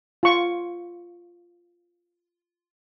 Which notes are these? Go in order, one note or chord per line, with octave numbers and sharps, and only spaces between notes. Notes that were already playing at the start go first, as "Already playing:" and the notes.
F4 C#6